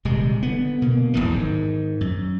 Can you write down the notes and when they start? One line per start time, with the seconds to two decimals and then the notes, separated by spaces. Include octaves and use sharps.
0.05 D#1 C3 G#3
0.43 D3 B3
0.82 B2 A#3
1.13 D1 G#1 E2 E3
1.31 G#2 D#3
2.01 F#2